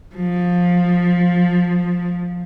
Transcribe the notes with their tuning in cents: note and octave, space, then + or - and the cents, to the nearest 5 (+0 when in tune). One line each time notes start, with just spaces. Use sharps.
F3 +15